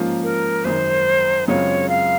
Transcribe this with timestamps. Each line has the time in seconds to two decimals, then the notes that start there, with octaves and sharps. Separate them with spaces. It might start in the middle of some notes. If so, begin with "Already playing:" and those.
Already playing: G#2 F3 A#3 C#4 F4
0.23 A#4
0.65 G#1 F#2 D#3 C5
1.48 F#2 C#3 G#3 C4 F4 C#5
1.89 F5